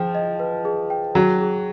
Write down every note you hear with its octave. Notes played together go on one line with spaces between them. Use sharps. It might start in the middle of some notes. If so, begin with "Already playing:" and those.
Already playing: F3 G#4 G5
D#5
B4
G#4
G5
F#3 G#4
G#4